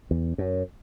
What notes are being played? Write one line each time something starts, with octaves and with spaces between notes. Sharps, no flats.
E2
F#2